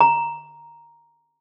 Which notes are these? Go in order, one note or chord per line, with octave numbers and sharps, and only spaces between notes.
A#5